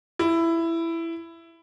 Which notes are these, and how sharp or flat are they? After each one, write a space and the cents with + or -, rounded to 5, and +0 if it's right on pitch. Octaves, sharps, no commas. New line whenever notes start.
E4 +10